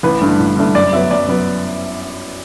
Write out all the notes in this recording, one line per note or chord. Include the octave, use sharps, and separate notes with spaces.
A1 B4
G2 D3 A3
A1
G2 D3 A3
F#2 D5
F#3 B3 E5
F#2 D5
F#3 B3